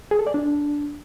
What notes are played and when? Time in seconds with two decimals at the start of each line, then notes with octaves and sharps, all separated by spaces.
0.11 G#4
0.19 A4
0.27 D5
0.34 D4